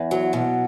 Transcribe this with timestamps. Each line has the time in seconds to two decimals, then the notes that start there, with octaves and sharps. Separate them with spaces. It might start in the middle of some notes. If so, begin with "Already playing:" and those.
Already playing: E2
0.11 F#3
0.33 B2